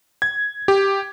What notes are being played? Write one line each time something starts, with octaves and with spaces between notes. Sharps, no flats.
G#6
G4